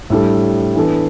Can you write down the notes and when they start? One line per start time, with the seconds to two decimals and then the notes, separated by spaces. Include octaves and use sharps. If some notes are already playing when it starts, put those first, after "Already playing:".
0.10 A2 G3 D4 A4
0.75 E3 B3 D4 A4